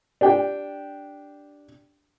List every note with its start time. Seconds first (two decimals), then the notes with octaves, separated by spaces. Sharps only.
0.21 D4 G4 G5